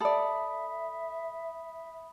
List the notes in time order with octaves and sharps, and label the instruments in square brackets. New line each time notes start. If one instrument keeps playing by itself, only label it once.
[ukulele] A4 D5 [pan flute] E5 [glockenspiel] B5 D#6